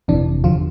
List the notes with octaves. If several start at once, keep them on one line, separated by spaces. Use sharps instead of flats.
G1 F2 C3 E3 D4
E2 D3 F3 F4